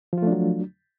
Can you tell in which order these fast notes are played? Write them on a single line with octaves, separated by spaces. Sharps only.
F3 F4 A3 D4 F#3